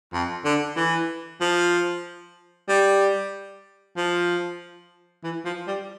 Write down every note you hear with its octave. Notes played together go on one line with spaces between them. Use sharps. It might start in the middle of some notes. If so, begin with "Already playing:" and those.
F2
D3
E3
F3
G3
F3
E3
F3
G3